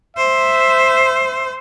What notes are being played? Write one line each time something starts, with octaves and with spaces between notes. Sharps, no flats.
C5 E5